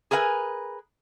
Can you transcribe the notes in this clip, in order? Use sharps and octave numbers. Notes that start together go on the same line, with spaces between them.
G#4 A#4 B4 F5 G#5